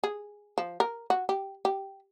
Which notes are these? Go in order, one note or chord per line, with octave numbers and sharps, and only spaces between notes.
G#4
F3
A#4
F#4
G4
G4